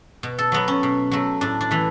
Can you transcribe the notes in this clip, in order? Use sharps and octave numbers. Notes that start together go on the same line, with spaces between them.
B2
A4
F#3 A3 B3
C#4
B2
F#3 A3
A2 D4
D4
E3 A3